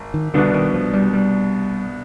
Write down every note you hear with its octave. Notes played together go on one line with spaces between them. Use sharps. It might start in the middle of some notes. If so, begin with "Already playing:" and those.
Already playing: G#1
D#3
C2 B2 D3 B3 D4
D#3
F3
G3
G3